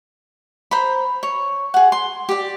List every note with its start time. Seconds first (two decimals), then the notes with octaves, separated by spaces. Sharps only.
0.71 C5 A#5 B5
1.23 C#5
1.74 G#4 F#5
1.92 C6
2.29 G4 D5